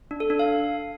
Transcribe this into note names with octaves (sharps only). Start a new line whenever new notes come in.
D4
A4
D4
F5